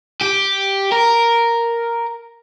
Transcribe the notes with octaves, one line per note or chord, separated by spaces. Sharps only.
G4
A#4